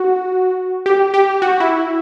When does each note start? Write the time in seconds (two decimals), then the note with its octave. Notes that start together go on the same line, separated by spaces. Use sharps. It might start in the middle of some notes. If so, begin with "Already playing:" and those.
Already playing: F#4
0.86 G4
1.14 G4
1.42 F#4
1.60 E4